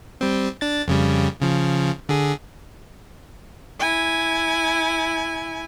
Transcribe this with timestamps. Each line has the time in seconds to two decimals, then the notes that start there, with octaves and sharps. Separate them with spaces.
0.21 G3 C4
0.61 D4 A6
0.88 F2 C#3 G3
1.41 C#3 F3
2.09 D3 G#4
3.80 E4 G#5